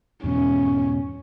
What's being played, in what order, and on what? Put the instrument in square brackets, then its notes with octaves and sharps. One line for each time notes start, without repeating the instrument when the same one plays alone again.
[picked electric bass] E2 G#2 B2 [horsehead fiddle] C#4